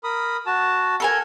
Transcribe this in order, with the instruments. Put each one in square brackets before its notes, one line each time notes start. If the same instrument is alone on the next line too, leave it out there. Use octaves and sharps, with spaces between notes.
[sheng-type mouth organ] A#4 B5 D#6
F#4 A5
[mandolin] A4 A#4 G#5